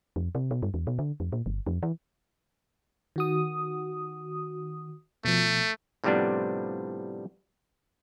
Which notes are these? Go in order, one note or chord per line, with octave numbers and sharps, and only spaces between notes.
F2
C3
B2
G2
E2
B2
D3
F2
A#2
G1
F2
E3
D#3 F#4 D#6
B2 F3 A3
A2 C3 F3 G3 B3 D4